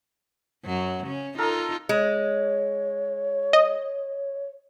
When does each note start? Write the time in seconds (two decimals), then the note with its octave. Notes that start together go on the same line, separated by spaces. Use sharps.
0.64 F#2 F#3
1.05 C#3 C#4
1.38 D#4 F4 A4 A#4
1.89 G#3 C#5
3.53 D#5